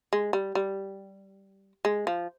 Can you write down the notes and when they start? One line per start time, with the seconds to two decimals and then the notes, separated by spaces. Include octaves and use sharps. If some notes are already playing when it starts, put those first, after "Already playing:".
0.13 G#3
0.33 G3
0.55 G3
1.85 G#3
2.07 F3